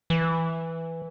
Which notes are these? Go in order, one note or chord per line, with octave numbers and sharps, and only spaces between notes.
E3